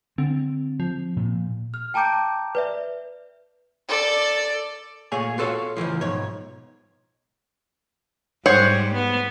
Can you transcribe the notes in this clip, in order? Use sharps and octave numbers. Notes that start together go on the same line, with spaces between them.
D3 C4
F3
A#2
F6
G5 A5 A#5 D6 G6 D7
B4 D5 E5
A4 D5
A#2 A3 G#4 C#5 G#5
F4 F#4 A4 C#5 F5
C#2 A2 E3 F3
B1 G#2 C#5
G#2 G3 C5 C#5 F#5
B3